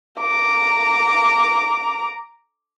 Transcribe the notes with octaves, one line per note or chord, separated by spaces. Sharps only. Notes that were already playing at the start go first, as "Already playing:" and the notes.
A#5 D6